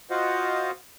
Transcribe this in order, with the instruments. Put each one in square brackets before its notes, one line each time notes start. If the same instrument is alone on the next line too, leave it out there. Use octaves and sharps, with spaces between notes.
[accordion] F4 F#4 C5 D#5 F5 F#5